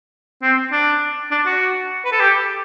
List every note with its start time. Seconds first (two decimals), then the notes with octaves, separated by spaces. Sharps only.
0.43 C4
0.72 D4
1.32 D4
1.46 F#4
2.05 B4
2.12 A4
2.20 G4